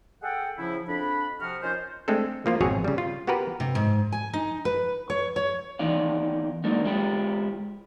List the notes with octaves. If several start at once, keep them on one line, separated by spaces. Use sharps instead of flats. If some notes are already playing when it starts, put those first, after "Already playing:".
G#4 A4 F#5 G5
C#3 F3 E4
F2 D4 B5
C3 F3 F#4 F6
C#4 D#4 F4 A#4 C5
G#3 A3 C4 D4 A4
F3 A#3 F4
G#1 F2 B2 F#3 G#4 C#5
C#3 G3
F4
B3 F#4 G4 A#4 B4
C3
G#2
G#5
D#4
B4
C#5
C#5
E2 D#3 E3 D#4 D5 F5
F#3 G#3 A#3 D4 D#4
G#3 E4 F4 G4